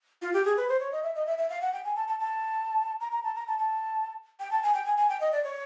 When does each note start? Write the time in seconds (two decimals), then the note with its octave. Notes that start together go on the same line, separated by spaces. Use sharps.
0.22 F4
0.34 G4
0.45 G#4
0.57 B4
0.69 C5
0.80 C#5
0.92 D#5
1.03 E5
1.15 D#5
1.27 E5
1.38 E5
1.50 F5
1.62 F#5
1.73 G5
1.85 G#5
1.96 A5
2.08 A5
2.19 A5
3.00 A#5
3.12 A#5
3.24 A5
3.35 A#5
3.47 A5
3.58 A5
4.40 G5
4.51 A5
4.63 G#5
4.74 G5
4.86 G#5
4.97 G#5
5.09 G5
5.21 D#5
5.32 D5
5.44 C#5